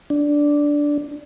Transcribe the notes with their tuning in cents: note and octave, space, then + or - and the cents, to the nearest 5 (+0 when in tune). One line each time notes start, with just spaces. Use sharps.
D4 -5